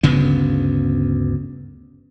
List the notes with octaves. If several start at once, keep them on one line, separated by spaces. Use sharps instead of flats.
G1 D2 C#3 B3